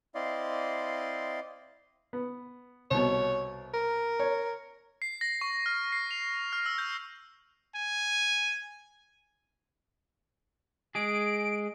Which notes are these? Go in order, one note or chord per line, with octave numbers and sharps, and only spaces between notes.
C4 E4 D5 D#5 F5 C6
B3
C2 B2 C#5
A#4
C#5
C7
A#6
C#6
F6
C7
F7
F6
E6
G6
G#5
G#3 G#4 D7